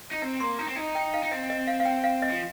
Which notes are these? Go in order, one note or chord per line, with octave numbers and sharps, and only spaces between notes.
D#4
C4 A#5
A#3 C6
D#4 A#5
C4
D#4
G5
F5
D#4
C4 D#5
D#5
F5
F5
G5
F5
D#5
F3